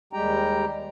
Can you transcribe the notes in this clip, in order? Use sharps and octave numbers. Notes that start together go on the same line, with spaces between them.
D#2 G3 G#3 G4 G5 A#5